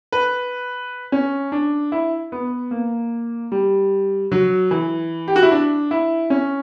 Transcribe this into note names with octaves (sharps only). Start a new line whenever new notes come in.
B4
C#4
D4
E4
B3
A#3
G3
F#3
E3
G4
F#4
E4
D4
E4
C#4